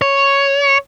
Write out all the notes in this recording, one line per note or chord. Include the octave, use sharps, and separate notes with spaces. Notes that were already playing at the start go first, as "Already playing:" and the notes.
C#5